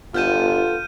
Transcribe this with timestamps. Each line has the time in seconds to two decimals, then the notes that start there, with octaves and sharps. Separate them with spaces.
0.14 G1 B3 F4 A4 A5 F6 G6 D#7